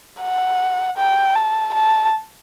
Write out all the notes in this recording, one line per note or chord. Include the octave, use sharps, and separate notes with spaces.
F#5
G5
A5
A5